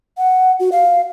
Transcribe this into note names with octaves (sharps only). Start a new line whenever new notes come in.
F#5
F#4
F5